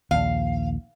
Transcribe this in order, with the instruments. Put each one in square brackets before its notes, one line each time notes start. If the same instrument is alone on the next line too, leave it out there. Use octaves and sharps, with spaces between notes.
[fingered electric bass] A#1 D#2 [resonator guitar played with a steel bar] F5